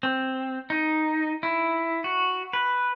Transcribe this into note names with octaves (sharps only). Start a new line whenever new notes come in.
C4
D#4
E4
F#4
B4